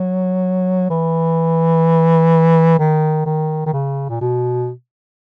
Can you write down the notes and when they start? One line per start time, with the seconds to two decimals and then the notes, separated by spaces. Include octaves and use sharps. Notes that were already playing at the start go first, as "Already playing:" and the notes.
Already playing: F#3
0.90 E3
2.79 D#3
3.26 D#3
3.66 D#3
3.73 C#3
4.10 A#2
4.21 B2